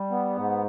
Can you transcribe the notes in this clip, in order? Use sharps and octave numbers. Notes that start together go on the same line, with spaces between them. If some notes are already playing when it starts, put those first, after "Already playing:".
Already playing: G3
B3
G#2